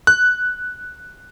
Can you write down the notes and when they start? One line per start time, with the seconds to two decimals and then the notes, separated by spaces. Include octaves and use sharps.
0.07 F#6